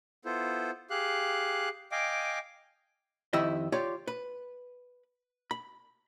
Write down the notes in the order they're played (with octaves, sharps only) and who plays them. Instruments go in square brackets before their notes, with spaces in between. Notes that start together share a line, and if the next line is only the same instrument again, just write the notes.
[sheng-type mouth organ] B3 E4 F4 A4 C5
G4 G#4 F5 F#6
D#5 F5 G5 G#5 D6
[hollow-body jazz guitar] F2 D#3 E4 G4 D#5 E5
F4 G4 C#5 D5
B4
B5